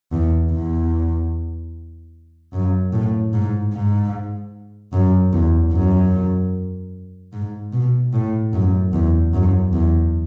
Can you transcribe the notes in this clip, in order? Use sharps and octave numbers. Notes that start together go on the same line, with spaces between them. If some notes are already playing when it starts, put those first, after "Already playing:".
E2
E2
F#2
A2
G#2
G#2
F#2
E2
F#2
G#2
B2
A2
F#2
E2
F#2
E2